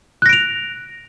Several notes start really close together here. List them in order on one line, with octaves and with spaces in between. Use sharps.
F#6 A#6 D7 F7